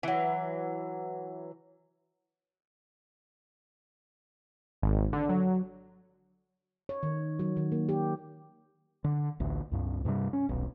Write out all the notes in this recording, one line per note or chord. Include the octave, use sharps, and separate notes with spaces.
E3 F#3
G#1
D3
F#3
C#5
D#3
F#3
D#3
A#3
G4
D3
A1 D2
C#2 G2
G2 C3 F3 G3
C#4
D#1 B1